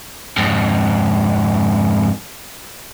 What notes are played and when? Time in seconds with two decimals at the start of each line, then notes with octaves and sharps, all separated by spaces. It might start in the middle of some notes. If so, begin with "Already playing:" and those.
0.38 F2 G#2